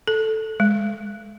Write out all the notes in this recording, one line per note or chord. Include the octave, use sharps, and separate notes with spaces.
A4
G#3